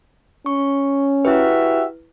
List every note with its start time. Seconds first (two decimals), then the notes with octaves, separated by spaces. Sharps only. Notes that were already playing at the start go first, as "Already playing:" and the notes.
0.46 C#4 C#6
1.25 E4 F#4 G4 B4 E5